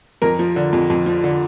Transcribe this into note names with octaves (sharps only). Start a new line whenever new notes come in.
F2 A#4
F3
D3
F2
F2
F3
D3